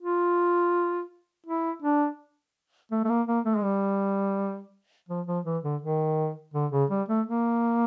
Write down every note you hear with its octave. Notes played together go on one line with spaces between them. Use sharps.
F4
E4
D4
A3
A3
A#3
A#3
A3
G#3
G3
F3
F3
E3
D3
D#3
D3
C#3
G3
A3
A#3